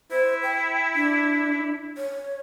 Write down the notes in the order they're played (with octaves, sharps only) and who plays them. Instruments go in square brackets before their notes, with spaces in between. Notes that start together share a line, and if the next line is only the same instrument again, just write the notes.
[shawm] E4 [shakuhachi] C5
[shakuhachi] G5
D4
C#5